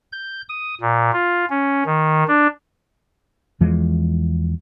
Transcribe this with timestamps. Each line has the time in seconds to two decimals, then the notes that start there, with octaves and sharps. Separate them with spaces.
0.12 G6
0.49 D#6
0.81 A#2
1.13 F4
1.50 C#4
1.86 D#3
2.28 D4
3.60 E2 E3 F3 G#3